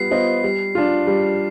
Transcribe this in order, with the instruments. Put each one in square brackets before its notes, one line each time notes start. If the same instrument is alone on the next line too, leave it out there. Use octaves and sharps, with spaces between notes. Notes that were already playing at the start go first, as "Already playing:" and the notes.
Already playing: [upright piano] G3 B3 F4 [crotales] C7
[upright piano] B3 F4 C5 D#5
G3
D4 F4
G3